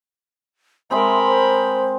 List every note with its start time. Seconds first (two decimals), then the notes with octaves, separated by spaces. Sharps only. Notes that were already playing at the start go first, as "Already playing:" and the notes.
0.91 G#3 C4 A#4 E5 B5
1.28 C5